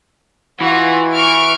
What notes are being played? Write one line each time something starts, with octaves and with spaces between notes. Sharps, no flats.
E3 F4 F#4
C#6 F6 D7